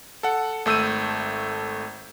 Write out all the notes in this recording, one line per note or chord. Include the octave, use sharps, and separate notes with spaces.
A4 F#5
G#1 A3 E6 G6 D#7